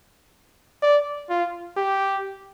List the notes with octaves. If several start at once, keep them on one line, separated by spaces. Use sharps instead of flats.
D5
F4
G4